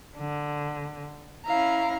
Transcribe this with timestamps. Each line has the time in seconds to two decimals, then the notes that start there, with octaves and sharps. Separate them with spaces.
0.16 D3
1.45 C#4 E4 F5 A#5